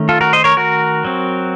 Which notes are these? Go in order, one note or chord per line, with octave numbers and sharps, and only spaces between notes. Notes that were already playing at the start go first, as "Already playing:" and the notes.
Already playing: D#3 A3 C#4
F4 A4
F#4 A#4
C5 D#5
A#4 C#5
F#4 A#4
F#3 C4